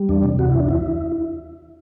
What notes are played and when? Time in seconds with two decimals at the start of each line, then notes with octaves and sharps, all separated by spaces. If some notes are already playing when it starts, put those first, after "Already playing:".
Already playing: G3
0.09 E2 D4
0.24 C3
0.39 E2 F#4
0.49 E2 E4
0.60 D4
0.69 E2 E4